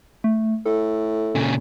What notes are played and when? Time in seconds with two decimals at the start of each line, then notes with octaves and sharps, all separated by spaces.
0.24 A3
0.66 A2 A4
1.35 A#2 C#3